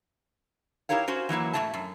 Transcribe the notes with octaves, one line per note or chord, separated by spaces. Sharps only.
D#4 E4 G4 A#4 C#5 F5
C#4 F#4 C5
E3 F#3 A#3 E4
A2 A3 F4 E5 A5
F#2